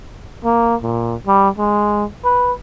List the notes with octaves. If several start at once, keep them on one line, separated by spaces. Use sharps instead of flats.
A#3
A#2
G3
G#3
B4